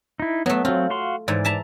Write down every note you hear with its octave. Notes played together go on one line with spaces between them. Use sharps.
D#4 E4
F#3 A3 B3
F#3 C4 F4
F#4 F5 C6
G#2 E3 D5
E5 A5 A#5